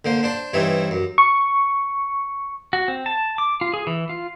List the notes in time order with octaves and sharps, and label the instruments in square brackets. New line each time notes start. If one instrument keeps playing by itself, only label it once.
[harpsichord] D3 A#3 C5
D4 C5 A5
G2 E3 C4 D#4 C#5 E5
F#2
[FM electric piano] C#6
[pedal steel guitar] F#4
C4
A5
D6
F4
G#4
E3
F4